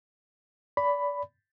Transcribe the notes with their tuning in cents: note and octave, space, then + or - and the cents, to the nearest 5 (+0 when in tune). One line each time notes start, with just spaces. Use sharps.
D5 -30 B5 +5